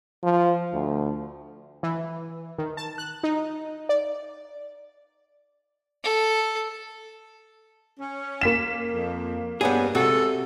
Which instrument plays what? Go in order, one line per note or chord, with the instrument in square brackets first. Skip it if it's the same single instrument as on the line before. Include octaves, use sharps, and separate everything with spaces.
[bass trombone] F3
D2
[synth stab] E3
D#3
A5
F#6
D#4
D5
[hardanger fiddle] A4
[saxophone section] C#4
[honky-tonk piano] A#3 B6 E7
[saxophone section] F2
[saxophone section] G2 [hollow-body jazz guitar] B3 C#4 G#4
[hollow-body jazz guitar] C3 F#4 [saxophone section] G#3 A4